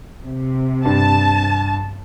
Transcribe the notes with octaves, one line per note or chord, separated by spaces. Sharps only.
C3
G2 A5